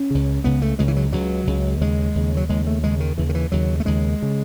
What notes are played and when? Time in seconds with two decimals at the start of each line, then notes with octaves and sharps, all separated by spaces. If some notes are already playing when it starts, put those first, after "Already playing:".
Already playing: C#4
0.11 C#2 C#3
0.44 C#2 C#3 B3
0.62 A3
0.79 C#2 C#3 G#3
0.88 E3
0.96 F#3
1.12 C#2 C#3 F#3
1.47 C#2 C#3
1.81 D#2 C#3 G#3
2.15 D#2 C#3
2.37 F#3
2.49 D#2 C#3 G#3
2.67 A3
2.83 D#2 C#3 G#3
3.00 D#3
3.17 D#2 C#3 E3
3.29 D#3
3.35 E3
3.52 D#2 C#3 F#3
3.80 A3
3.85 D#2 C#3 G#3
4.22 C#3